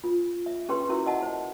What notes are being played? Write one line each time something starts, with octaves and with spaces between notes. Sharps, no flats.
F4
E5
C#4 G4 G#4 B4 G5 C6
C#4 E4 F#4 A#4 E5
D#5 E5 F#5 A5
C5